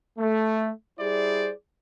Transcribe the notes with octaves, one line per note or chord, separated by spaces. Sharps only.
A3
G3 E4 G#4 C5 D5